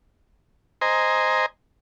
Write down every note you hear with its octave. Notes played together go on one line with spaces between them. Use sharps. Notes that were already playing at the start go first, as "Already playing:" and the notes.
C5 D#5 G#5 A#5